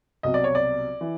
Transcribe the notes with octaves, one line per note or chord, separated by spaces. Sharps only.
C2 B2 F#3 D#5
D5
C#5
D5
E3